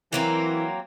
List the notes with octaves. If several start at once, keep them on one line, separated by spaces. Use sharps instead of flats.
E3 F#3 A#3 C4